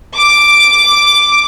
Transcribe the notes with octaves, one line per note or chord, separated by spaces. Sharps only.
D6